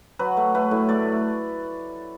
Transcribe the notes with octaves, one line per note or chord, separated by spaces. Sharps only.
F#3 B4
A3
A3 B4
A2
A3 D5